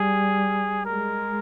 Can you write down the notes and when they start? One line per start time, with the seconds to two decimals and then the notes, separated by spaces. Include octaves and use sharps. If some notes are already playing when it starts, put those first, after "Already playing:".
Already playing: G3 G#4
0.85 G#3 A#4